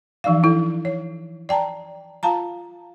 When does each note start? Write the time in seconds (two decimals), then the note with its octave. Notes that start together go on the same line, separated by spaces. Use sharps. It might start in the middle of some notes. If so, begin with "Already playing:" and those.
0.24 E3 F3 D#4 D5 F5
0.43 D4 E4 A4
0.85 C#5
1.49 D5 G5 A5 A#5
2.23 F4 F5 A5 A#5